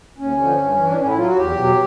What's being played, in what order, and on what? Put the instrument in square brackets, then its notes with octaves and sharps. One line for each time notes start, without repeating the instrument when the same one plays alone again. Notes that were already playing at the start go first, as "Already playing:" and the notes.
[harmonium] D#2 C#4
D3 F3
G2
E3
D4
A2 C#4
E4
F#3 F4
F#4
E2 G4
B2 F#3